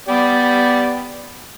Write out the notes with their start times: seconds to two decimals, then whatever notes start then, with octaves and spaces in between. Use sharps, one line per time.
0.08 B3 G4 D5